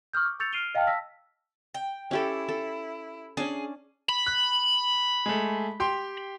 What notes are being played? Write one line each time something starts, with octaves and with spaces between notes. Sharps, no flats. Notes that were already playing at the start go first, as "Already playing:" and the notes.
C#6 D#6 F6 G6
D6
C#6 E6 G6 A6 C#7 F7
F6 C7 D7 D#7 F7 G7
D#5 F5 G5 A5 F6
A5 E6 A#6 B6
G5
C#4 E4 G4 A4
A4
C#4 D4 G#4
B5
F#6
G#3 A3
G4 G5 C6